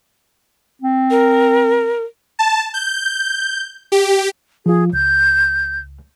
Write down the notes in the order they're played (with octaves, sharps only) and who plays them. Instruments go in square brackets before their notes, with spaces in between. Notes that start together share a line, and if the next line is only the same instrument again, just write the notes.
[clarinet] C4
[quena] A#4
[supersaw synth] A5
G6
G4
[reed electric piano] F3 F4 [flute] G#4
[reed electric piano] C#2 [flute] G6